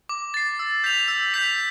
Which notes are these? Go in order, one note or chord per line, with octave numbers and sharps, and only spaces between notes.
D6
A6 C7
E6
G6 B6 F7
E6
G6 B6 F7